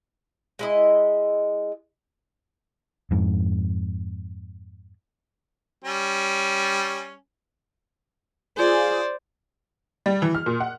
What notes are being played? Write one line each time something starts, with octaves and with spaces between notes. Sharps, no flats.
G#3 E4 D#5
F2 G#2
G3 C#4
F4 G#4 C5 D5
G3
E3
F6
A#2
F#5